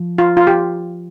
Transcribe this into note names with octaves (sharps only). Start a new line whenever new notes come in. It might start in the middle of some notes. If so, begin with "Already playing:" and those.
Already playing: F3
F4
F4
G4